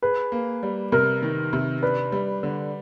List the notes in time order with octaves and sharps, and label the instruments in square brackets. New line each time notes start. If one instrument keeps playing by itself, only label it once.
[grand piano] G#4 [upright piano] B4
[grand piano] A#3
G3
[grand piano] C3 [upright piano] A#4
[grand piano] D#3
C3
[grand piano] D4 [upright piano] B4
[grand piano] G3
D3